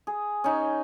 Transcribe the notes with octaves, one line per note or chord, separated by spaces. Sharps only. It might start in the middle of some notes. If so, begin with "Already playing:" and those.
G#4
C#4 D#4